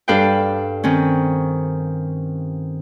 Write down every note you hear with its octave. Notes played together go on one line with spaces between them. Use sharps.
G2 D4 A4 B4 F5 G5
D#3 C4 C#4